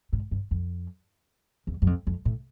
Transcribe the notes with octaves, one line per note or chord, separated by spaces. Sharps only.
G#2
G2
F2
E2
F#2
F2
F2
A2